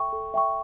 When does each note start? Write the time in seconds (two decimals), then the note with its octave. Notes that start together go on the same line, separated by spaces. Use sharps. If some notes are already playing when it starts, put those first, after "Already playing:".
Already playing: A4 E5 G5 C#6
0.13 A4
0.34 E5 G5 C#6